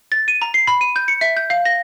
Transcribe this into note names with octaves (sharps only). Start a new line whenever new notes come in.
A6
D#7
A#5
C7
B5
D#7
G6
C#7
E5
G6
F5
A#6